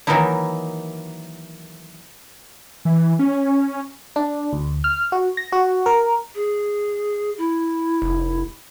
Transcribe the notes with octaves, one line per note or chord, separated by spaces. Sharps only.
D#3 E3 F#3 A#3 D#4 E4
E3
C#4
D4
D2
F6
F#4
A#6
F#4
A#4
G#4
E4
F1